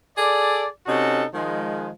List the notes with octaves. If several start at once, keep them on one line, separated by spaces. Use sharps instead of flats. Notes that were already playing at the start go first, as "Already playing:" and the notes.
G#4 A4 D5
C3 C#4 D#4 F#4 A4
D#3 F3 G#3